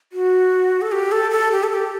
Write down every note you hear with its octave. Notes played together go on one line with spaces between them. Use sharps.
F#4
A4
G4
A4
A4
G4
A4
G4